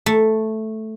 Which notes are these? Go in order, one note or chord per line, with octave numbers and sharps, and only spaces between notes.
A3